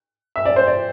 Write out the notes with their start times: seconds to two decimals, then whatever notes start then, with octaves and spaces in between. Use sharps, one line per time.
0.36 E5
0.45 D5
0.56 C5
0.67 D5